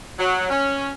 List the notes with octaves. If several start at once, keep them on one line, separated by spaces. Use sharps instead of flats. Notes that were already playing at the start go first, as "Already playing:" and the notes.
F#3
C#4